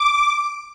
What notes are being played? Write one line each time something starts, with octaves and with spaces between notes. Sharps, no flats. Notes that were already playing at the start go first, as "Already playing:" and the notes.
Already playing: D6